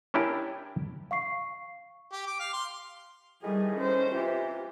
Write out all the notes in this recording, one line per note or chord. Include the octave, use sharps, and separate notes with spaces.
C#4 D4 E4 G4 A#4 D5
F5 C#6 C7
G4
D6
F5
C6
A2 D#3 E3 G3 G#4
C#4 C5
C3 E3 F4 G4